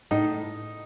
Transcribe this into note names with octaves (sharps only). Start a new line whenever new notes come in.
A2 D#4